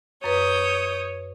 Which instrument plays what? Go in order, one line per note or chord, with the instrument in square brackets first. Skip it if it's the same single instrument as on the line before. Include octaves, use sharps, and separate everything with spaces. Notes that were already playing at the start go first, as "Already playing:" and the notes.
[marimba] F#2 B4 [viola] C#5 [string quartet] D#6 G6